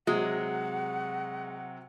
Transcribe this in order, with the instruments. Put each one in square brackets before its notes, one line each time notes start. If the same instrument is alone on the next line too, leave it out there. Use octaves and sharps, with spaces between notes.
[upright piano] C3 F#3 [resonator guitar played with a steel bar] G#3 [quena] F#5